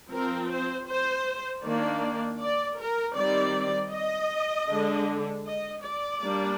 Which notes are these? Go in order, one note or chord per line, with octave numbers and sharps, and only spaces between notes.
F3 C4 A#4
C5
C5
D#3 A#3 D4 D5
D5
A#4
D#3 G3 C4 D5
D#5
D3 G#3 D4
D#5
D5
G3 A#3 D4